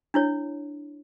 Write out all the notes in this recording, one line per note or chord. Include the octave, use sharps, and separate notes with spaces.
D4 E4 C#5